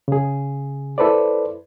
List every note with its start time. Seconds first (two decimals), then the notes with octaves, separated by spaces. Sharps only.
0.08 C#3 G#4
0.98 E4 A4 B4 C5 D5